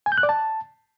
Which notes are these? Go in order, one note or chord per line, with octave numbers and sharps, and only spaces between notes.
G#5
G6
F#6
D5
A5